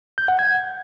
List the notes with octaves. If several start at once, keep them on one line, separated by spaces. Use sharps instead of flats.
G6
F#5
G#6